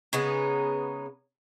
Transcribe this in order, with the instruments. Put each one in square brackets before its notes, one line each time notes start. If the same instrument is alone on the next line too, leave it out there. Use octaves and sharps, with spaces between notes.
[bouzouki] C#3 G#3 B3 D#4